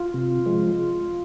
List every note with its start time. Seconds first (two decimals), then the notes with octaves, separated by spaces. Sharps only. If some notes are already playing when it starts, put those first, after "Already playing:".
Already playing: F4
0.14 C3
0.46 F3 G#3